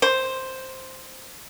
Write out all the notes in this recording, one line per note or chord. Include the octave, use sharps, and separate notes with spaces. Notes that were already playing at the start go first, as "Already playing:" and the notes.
C5